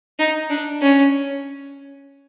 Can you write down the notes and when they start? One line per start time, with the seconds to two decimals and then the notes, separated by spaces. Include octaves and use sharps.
0.19 D#4
0.50 D4
0.82 C#4